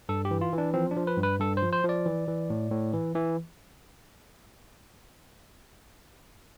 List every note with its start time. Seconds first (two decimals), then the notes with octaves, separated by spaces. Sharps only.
0.09 G2 A4
0.25 G4
0.31 E3
0.41 F4
0.53 E3
0.58 D4
0.74 F3 C4
0.91 D4
0.96 F3
1.07 B4
1.18 G2
1.23 B4
1.40 G2 A4
1.57 C5
1.63 F3
1.73 C5
1.84 F3
1.89 D5
2.06 E3
2.28 E3
2.50 A2
2.71 A2
2.93 E3
3.15 E3